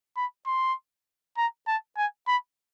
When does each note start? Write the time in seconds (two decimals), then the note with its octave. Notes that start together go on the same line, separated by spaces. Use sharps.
0.17 B5
0.46 C6
1.37 A#5
1.67 A5
1.97 G#5
2.28 B5